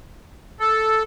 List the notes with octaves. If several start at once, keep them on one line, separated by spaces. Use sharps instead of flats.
A4